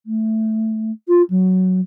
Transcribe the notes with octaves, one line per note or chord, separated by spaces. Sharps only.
A3
F4
F#3